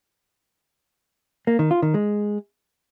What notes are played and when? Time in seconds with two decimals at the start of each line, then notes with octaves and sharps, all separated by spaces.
1.47 A#3
1.59 D#3
1.71 F4
1.82 D#3
1.94 G#3